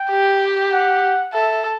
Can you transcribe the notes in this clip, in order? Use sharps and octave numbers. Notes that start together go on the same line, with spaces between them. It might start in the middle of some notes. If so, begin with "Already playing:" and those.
Already playing: G5
G4
F#5
A4 E5